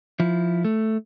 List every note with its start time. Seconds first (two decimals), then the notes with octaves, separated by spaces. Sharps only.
0.20 F3 E4
0.65 A3